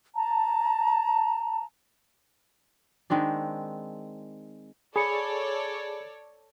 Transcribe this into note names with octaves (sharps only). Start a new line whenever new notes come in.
A5 A#5
D#3 G#3 C4 D4
G#4 A4 C#5 D5 B5 C#7